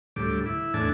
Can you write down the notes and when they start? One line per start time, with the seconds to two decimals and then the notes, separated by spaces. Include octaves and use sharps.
0.16 D2 A2 G3 D6
0.46 E4
0.74 E2 A2 D4 G#5 A5